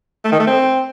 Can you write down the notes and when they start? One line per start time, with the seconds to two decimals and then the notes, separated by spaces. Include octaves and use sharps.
0.25 A3
0.32 D#3
0.40 A3
0.47 C4